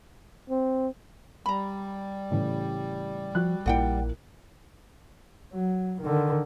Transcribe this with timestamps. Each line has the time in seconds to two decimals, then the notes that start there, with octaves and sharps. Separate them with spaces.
0.50 C4
1.46 G3 A#5 B5
2.31 A2 C#3 E3
3.35 F3 F#4 F#6
3.66 A#1 A#2 A#3 E4 D5 F#5 G5
5.53 F#3
6.01 D3 D#3